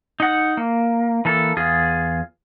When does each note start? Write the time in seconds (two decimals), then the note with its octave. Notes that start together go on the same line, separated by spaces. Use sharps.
0.20 D#4 F#5
0.57 A#3
1.25 E3 A#3 A4
1.57 E2 F4 G#4